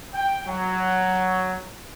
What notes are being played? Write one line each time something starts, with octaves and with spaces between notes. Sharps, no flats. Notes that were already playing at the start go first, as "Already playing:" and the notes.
G5
F#3